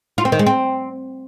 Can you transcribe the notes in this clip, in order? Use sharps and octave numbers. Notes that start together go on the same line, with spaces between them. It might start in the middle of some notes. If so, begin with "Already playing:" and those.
F4
C4
D#3
G#3
C4